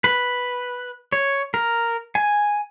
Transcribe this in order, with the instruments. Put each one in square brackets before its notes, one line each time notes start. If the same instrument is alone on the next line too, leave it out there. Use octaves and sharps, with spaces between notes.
[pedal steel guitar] B4
C#5
A#4
G#5